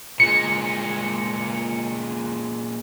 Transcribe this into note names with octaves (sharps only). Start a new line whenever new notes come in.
A#2 G#3 C#7